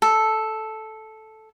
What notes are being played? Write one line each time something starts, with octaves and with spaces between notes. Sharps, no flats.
A4